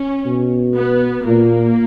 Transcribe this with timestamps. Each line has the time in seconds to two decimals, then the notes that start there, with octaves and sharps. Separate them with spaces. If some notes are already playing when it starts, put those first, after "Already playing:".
Already playing: C#4
0.26 B2
0.76 B3
1.26 A#2 A#3